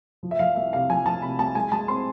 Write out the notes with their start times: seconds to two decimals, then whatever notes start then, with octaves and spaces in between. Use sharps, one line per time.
0.23 F3
0.31 E5
0.39 F3 F5
0.56 C2 E5
0.72 C3 F5
0.89 F3 G#5
1.05 F3 A5
1.22 C3 B5
1.39 C2 A5
1.55 G#3 G#5
1.72 G#3 A5
1.88 C4 C6